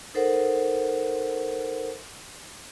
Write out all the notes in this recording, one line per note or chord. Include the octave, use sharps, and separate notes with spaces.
D#4 A4 A#4 C5 F#5